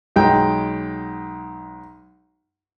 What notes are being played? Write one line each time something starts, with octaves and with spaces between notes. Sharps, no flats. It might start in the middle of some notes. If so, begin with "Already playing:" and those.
B1 G#3 G5